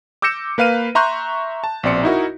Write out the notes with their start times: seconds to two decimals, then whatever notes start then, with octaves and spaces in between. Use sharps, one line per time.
0.22 D6 E6 G6 A#6 C#7 E7
0.58 A#3 B4 F5 F6 D#7
0.95 E5 A#5 C6 C#6 F#6 G6
1.64 A5
1.83 A#1 B2 C4 D5 C6 C#7
2.04 D#4 E4 F#4 A#4